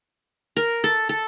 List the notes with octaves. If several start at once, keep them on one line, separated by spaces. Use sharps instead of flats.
A#4
A4
A4